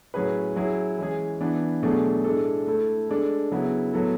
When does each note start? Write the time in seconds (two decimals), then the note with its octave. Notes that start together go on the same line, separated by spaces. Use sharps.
0.14 A2 F#3 C#4 G#4 B4
0.56 F#3 C#4 E4 G#4
0.99 E3 G#3 C#4 G#4
1.41 E3 B3 D4
1.82 B2 F#3 A3 D4 G#4
2.24 A2 G#3 D4 A4
2.67 A3 E4 A4
3.09 G#3 D4 A4
3.52 C#3 F#3 B3 E4
3.93 A2 F#3 B3 F#4 A4